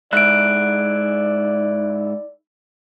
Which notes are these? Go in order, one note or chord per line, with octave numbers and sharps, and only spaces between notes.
G#2 E4 D5 F#6 D7